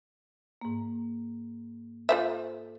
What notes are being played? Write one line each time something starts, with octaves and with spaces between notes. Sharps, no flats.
G#2 A#3
F4 A4 C5 E5